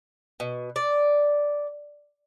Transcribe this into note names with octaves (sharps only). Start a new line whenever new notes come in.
B2
D5